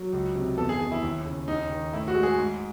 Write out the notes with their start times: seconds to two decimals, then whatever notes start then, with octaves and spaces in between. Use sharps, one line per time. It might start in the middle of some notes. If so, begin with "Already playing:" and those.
Already playing: F#3
0.13 C#2
0.35 C3
0.58 E2 A4
0.69 G#4
0.80 D#3 G#4
0.92 E4
1.03 D#2
1.25 C#3
1.48 D#2 D#4
1.70 D#3
1.93 A2 E4
2.08 F#4
2.15 G#3
2.23 G#4
2.38 G#2